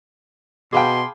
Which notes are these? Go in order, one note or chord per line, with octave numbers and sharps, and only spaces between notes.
B2 G#4 F5 G5 A5 B5 C6 D6